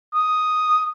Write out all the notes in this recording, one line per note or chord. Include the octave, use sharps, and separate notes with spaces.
D#6